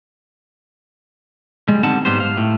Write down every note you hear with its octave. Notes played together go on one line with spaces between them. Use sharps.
G3 G#3
D3 G3 C4 D#4 F#5 A5
G#2 G3 B3 G4 C5
F5
A2